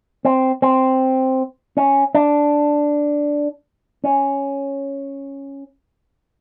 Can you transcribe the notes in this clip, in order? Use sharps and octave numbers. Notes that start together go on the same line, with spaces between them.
C4
C4
C#4
D4
C#4